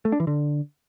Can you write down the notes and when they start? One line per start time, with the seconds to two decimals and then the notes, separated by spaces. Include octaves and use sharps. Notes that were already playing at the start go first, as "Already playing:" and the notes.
0.05 A3
0.12 D4
0.20 E3
0.27 D3